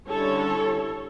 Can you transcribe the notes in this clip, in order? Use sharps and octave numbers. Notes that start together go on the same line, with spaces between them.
D3 G3 C#4 E4 A4 C#5